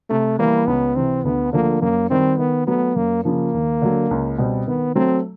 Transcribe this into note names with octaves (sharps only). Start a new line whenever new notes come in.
C3 A3
E3 G3 A#3 B3
C#2 B3
C3 E3 C4
D2 B3
D3 F3 A3 A#3
F#2 A#3
D#3 G3 C4
D#3 B3
F#3 A3 B3
F#2 A#3
C#3 F3 A#3
D#2
D3 F#3
C#2
B2 G3 C4
D#3 B3
F#3 A3 C4